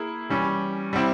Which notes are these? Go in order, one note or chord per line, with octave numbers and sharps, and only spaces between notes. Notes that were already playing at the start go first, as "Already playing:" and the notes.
Already playing: A#3 E4 G#4
E3 G3 C#4
G3 C4 E4